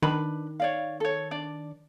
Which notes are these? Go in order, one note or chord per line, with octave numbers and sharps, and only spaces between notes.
D#3 D4 B4 B5
C#5 D5 F5
A4 C#5
D4 D5